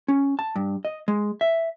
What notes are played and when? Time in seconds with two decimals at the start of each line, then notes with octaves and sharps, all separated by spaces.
0.08 C#4
0.39 A5
0.56 G2
0.85 D#5
1.08 G#3
1.41 E5